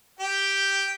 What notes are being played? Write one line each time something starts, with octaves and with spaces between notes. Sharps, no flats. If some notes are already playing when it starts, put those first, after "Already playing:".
G4 G5